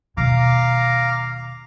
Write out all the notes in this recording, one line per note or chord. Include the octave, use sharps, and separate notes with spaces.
D#2 B2 F5 A#5 D6